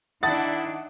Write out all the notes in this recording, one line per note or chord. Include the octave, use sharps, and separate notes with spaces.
D#3 D4 E4 F#5 A5 D#6 A6